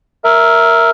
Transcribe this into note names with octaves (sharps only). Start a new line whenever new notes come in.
A#4 E5